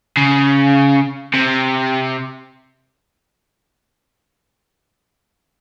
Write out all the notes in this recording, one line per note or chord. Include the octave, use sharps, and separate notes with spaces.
C#3
C3